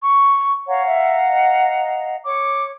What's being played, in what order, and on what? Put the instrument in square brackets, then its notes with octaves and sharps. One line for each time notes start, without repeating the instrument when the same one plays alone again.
[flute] C#6
[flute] C#5 [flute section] F5 F#5 A#5
[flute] E5
D#5
[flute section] C#5 [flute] D6